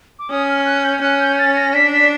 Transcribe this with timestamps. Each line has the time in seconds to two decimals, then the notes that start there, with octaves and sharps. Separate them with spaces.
0.19 D6
0.31 C#4 D#6
0.48 F6
0.66 F#6
0.84 G6
1.02 C#4 F#6
1.20 G6
1.39 A6
1.56 A#6
1.74 D4 B6
1.93 B6